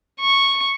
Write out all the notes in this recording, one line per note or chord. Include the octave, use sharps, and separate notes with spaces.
C#6